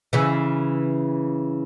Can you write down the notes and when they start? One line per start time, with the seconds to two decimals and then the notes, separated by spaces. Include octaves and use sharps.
0.13 C#3 E3